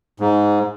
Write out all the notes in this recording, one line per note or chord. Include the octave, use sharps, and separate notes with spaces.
G#2